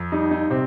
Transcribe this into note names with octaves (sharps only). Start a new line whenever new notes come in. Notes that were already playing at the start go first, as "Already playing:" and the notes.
Already playing: F2
G3 D#4
D#4
C3 C4